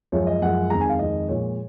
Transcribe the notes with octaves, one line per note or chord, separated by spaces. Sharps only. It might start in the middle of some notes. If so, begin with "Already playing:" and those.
F#2 F3 G#3 C#5
D#5
F#2 F3 G#3 F#5
F2 D#3 G#3 A#5
G#5
F5
F2 D#3 G#3 D#5
A#2 F3 G#3 C#5